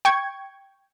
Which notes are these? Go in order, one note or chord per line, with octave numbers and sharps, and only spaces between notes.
G5 C#6 G#6